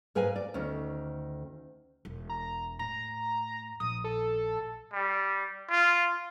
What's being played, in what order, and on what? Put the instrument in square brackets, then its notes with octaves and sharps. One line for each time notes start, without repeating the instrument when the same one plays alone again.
[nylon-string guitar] G#2 A#4 B4 F5 G#5
D5
D2 D#3 C#4
[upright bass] E1
[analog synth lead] A#5
[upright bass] A2 [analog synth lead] A#5
[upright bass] A#1 [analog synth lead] D#6
[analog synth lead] A4
[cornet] G3
F4